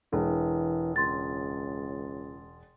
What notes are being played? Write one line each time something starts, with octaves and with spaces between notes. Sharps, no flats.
E1 E3
C#2 C6 A6